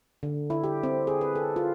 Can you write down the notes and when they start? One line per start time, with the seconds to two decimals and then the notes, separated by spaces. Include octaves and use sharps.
0.23 D3
0.50 E4
0.64 G4
0.83 C4
1.07 G#4
1.21 B4
1.36 A4
1.56 F4